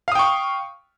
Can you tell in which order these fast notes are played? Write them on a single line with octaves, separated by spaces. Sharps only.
F5 D#6 G5 C#6